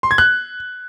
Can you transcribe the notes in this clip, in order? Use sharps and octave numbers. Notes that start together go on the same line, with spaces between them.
C6
G#6
F#6